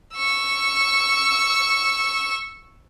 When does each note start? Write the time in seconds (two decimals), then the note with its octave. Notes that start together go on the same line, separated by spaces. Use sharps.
0.15 C#6 E6